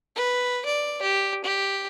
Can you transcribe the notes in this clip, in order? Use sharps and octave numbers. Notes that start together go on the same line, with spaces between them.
B4
D5
G4
G4